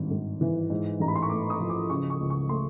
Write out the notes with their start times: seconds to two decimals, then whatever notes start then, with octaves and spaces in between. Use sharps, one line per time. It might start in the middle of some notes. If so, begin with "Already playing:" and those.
Already playing: G#1 G2
0.10 G#1
0.41 E3
0.70 G#2
1.00 A1 A#5
1.08 B5
1.15 C6
1.22 C#6
1.29 A3 D6
1.50 D#6
1.60 F3
1.69 D6
1.90 C#3 C#6
2.10 C#6
2.20 C#2
2.30 C#6
2.49 A3 C6